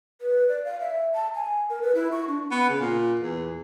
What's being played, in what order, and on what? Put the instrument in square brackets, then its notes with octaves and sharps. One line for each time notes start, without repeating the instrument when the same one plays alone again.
[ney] B4
D5
F5
E5
A5
G#5
A#4
B4
E4
C#6
D4
[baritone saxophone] B3
C#3
A#2
E2